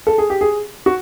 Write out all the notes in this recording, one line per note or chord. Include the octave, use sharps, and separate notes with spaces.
A4
G#4
G4
G#4
F#4